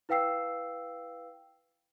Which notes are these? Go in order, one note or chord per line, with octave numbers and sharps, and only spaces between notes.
E4 B4 F5 G5 E6 C7